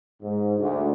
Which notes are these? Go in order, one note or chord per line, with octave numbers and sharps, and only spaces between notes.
G#2
D2